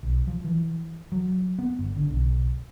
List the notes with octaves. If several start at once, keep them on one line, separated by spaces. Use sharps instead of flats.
B1
F3
E3
F#3
B3
G1
D3
B1